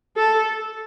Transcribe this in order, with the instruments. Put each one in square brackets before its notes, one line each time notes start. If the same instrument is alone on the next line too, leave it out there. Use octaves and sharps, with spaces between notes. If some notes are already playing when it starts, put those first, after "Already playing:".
[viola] A4